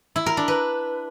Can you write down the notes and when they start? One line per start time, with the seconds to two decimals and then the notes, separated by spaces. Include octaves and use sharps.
0.16 E4
0.26 A#4
0.37 D4
0.48 B4